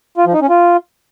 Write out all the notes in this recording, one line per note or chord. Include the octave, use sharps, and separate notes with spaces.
F4
F3
D#4
C#4
F4